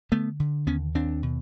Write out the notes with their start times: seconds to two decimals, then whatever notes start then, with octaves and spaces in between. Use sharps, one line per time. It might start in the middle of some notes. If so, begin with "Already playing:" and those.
0.12 D3 A3 B3
0.40 D3
0.67 D#2 B3 C#4
0.95 D#2 C4 D4
1.23 B2